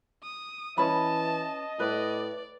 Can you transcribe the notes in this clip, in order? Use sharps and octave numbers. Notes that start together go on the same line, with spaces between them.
D#6
E3 C#4 D#5 A5 B5
A2 B4 D5